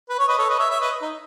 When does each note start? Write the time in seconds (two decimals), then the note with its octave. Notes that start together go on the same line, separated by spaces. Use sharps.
0.10 B4
0.19 C#5
0.28 B4 D#5
0.38 A4 C#5
0.49 B4 D#5
0.59 C#5 E5
0.70 C#5 E5
0.81 B4 D#5
1.02 D#4